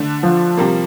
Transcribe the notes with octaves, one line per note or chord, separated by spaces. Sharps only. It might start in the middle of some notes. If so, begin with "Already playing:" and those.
Already playing: D3 A3 D4
F3
C3 G3 A#3